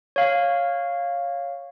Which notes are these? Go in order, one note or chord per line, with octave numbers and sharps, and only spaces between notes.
C#5 F5